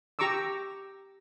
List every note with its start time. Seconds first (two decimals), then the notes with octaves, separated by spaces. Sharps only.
0.19 G4 A#5 C#6 D6 E6